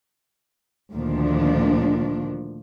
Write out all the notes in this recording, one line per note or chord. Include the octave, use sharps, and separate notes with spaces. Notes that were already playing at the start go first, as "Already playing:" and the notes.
D2 A#2 D#3 F3 D4